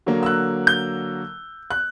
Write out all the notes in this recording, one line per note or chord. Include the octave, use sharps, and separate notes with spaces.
D3 F#3 A#3
E6
F#6
G6
F#6